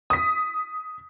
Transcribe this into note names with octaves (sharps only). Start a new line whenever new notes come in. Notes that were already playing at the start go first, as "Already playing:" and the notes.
D#6 B6